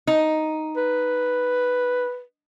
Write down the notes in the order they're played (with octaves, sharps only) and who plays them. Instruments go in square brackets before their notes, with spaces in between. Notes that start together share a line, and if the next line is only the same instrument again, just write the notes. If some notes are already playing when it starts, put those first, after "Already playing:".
[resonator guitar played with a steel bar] D#4
[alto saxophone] B4